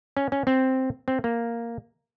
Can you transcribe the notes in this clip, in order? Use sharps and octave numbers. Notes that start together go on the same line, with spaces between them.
C#4
C#4
C4
C4
A#3